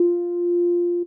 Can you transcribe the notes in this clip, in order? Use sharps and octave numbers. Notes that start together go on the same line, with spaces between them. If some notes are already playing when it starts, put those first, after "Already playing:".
Already playing: F4